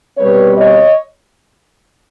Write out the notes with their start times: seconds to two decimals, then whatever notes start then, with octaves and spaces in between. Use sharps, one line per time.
0.17 B2 G3 C4 B4 C#5
0.57 C#5 D#5